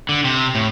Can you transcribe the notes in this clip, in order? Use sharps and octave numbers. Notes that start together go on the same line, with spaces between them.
D3
C3
A2